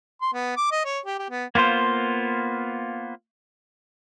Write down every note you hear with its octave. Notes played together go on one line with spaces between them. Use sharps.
C6
B3
D6
D#5
C#5
G4
G4
B3
A#3 B3 F4 C5